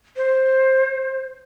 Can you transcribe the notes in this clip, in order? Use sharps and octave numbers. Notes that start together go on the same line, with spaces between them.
C5